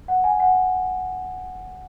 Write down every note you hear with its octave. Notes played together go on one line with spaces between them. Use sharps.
F#5
G#5
F#5